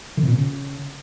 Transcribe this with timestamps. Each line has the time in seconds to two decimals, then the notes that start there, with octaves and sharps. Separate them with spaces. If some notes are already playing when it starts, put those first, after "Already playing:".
0.17 D#3
0.22 C3
0.28 A#2
0.33 C3
0.38 C#3